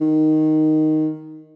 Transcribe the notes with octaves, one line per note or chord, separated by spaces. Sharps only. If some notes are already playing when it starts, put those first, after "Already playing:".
D#3